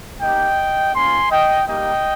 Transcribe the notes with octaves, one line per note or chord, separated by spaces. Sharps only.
A#3 D#4 G4 D#5 G5
A#3 C#4 F4 G#5 C6
D#5 G5
G3 A#3 D#4 G4 D#5 G5